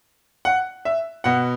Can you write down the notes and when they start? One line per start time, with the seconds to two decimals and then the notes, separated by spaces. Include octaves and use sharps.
0.45 F#5
0.85 E5
1.24 B2 F#5